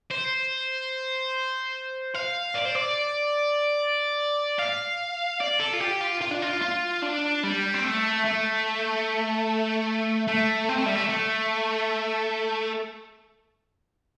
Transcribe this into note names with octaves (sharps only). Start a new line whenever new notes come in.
C5
F5
D5
C5
D5
F5
D5
A4
F4
G4
F4
F4
D4
F4
F4
D4
G3
C4
A3
A3
A3
C4
A3
G3
A3
A3